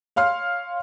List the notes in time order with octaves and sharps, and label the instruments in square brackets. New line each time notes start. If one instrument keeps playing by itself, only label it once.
[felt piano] C#5 F5 C6 F6